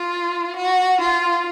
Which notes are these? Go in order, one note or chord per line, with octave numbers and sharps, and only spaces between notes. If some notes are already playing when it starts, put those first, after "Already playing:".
Already playing: F4
F#4
F4